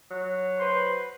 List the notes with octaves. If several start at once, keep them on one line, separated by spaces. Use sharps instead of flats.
F#3
B4 C5 C6